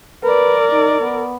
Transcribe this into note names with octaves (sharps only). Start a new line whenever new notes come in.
A#4 B4 D5
D#4
B3